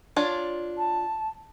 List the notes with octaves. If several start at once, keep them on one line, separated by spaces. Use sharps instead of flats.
D4 F4 C#5
A5